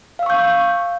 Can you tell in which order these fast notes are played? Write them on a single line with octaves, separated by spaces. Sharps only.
F5 E6 C#6 G6